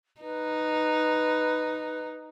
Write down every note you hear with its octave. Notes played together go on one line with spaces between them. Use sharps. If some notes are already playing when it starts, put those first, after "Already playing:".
D#4 B4